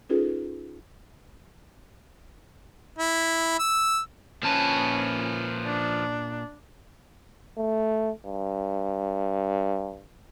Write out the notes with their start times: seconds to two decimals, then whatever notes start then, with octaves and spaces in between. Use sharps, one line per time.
0.10 C#4 D#4 F4 G#4 A4 B4
2.99 E4
3.59 E6
4.43 A#2 F3 C#4 B4 A5
5.65 D4
7.58 A3
8.26 G2